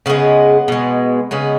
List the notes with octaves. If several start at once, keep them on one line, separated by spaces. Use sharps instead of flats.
C#3 G#3 B3
B2 G#3
C#3 G#3 B3